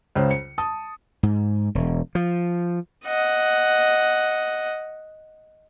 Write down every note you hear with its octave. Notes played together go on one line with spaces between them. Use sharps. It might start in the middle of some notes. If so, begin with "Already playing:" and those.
C#2 C#3 C5
C#7
A5 D#6
G#2
E1
F3
D#5 F#5